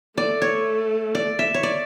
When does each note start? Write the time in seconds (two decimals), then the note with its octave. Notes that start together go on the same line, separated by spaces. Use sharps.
0.17 A3 D5
0.42 C#5
1.15 D5
1.39 E5
1.54 C#5
1.63 D5